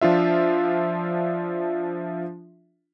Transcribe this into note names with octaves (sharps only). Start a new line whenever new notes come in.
F3 D4 F4 E5